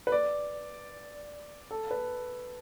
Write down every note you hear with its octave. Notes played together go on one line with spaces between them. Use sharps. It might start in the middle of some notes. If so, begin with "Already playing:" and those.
B4
D5
A4
B4